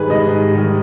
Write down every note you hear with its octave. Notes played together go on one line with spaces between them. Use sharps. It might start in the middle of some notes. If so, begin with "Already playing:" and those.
Already playing: G#2 D#3 G3 G#4 B4
G#2 D#5
D#3 G3